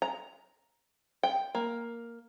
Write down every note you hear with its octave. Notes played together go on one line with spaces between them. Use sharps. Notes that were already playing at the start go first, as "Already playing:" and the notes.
A#5
G5
A#3